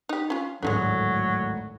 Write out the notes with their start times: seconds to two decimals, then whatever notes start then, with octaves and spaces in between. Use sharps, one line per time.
0.09 D#4 G4
0.30 C#4 F4
0.63 G#1 D2 A2 F#3 G#3 C#4 D4